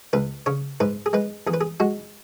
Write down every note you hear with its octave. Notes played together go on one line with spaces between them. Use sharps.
C#2 B4
C#3 C#5
G#2 B4
G#4
G#3 B4
E2 G#4
B4
G#4
G#3 F#4